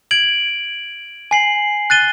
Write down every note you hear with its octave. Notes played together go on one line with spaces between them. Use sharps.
G#6 D7 F#7
G#5 C7 F#7
F#6 A6 D#7 G7